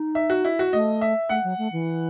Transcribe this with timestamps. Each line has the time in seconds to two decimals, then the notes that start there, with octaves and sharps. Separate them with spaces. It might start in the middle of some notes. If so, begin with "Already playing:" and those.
Already playing: D#4
0.15 E5
0.30 F#4
0.45 E4
0.59 F#4
0.73 A3 D#5
1.01 E5
1.29 A3 F#5
1.44 F#3
1.58 A3
1.72 E3